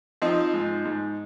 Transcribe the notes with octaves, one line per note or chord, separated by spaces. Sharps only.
F3 C4 D#4
G#2
G#2